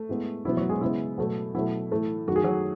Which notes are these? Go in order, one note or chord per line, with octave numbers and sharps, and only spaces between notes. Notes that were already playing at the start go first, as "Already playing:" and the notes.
Already playing: A3
A2 G#3 B3
B2 F#3 B3 E4
F#3 F#4
G#3 G#4
C#3 G#3 B3 E4
B2 F#3 A3
B2 F#3 A3 E4
A2 E3 A3
F#2 D#3 A3 F#4
G#4
F#3 F#4